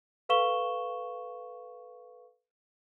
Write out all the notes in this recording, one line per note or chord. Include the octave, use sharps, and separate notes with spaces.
A4 B4 F5 C#6 E7 G7